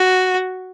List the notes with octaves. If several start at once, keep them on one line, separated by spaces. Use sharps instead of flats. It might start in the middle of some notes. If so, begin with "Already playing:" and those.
Already playing: F#4